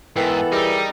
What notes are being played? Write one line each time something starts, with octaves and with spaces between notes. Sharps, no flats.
G#2 E3 B3 A4 A#4 G5
G3 D#4 G#4 A#4 E6